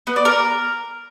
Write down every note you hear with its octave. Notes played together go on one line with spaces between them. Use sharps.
B3
D5
A#4